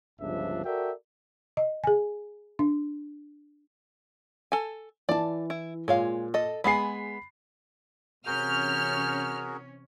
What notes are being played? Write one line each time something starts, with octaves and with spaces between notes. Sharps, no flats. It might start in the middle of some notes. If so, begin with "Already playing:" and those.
G1 C#2 G2 F3 D4 E5
F#4 A4 A#4 D5 E5 G5
D#5
G#4 G#5
D4
A4 G#5
E3 D5 A5
E4
A#2 G#3 C#5 F5
A4 D#5
G#3 B3 G#4 B5 C7
C3 E3 C#4 F#4 G#4 A#4 F6 G6